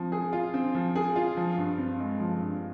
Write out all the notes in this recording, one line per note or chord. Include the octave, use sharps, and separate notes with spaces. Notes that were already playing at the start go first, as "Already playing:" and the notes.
Already playing: F3 C4
G#4
F4
C4
F3
G#4
F4
F3
G2
C4
G#3
F3
G2